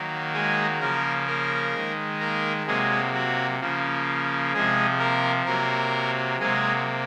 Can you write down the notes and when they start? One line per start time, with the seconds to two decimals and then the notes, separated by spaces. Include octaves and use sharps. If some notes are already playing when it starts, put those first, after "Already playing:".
Already playing: D#3 F#3 A#3
0.34 G#3 G#4
0.81 C#3 F3 A#3 A#4
1.27 A#3 A#4
1.74 D#3 G#3
2.20 A#3 A#4
2.66 C3 F#3 G#3 A#3 G#4
3.14 F#3 F#4
3.60 C#3 F3 A#3
4.53 C3 F3 G#3 G#4
4.99 A#3 A#4
5.46 C3 F#3 A#3 A#4
6.39 C3 F#3 G#3 A#3 G#4